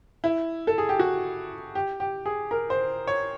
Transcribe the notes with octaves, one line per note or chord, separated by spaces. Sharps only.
E4
A4
G#4
G4
F#4
G4
G4
G#4
A#4
C5
C#5